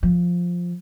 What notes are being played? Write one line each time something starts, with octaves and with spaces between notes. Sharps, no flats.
F3